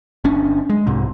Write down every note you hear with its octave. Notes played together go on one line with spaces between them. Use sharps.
G1 C#4 D4
G#3
C2 G#2 C3